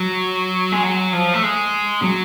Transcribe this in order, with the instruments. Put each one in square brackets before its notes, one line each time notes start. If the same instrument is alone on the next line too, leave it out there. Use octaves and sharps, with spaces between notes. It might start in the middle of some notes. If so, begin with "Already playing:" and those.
Already playing: [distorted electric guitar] F#3
G#3
F#3
F3
A3
G#3
F#3